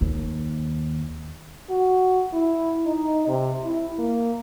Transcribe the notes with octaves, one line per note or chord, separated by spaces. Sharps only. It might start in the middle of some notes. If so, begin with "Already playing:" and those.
D#2
F#4
E4
D#4
C3
E4
A#3